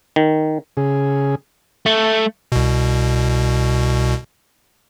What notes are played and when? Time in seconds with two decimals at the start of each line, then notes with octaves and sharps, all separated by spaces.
0.16 D#3
0.77 C#3 G#4
1.86 A3
2.52 C2 B2